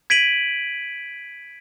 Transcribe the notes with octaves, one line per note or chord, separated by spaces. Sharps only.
G#6 B6 D7 D#7 F#7